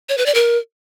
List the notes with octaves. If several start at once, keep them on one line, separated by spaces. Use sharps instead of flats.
C#5
B4
D5
A#4